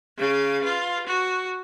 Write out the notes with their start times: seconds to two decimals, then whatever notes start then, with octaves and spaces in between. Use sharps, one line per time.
0.17 C#3 F5
0.63 F4 B4
1.06 F#4